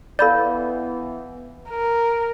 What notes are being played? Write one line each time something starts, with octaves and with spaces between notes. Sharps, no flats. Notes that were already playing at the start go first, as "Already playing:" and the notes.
E3 B3 A4 D5 F5 B5 G6
A#4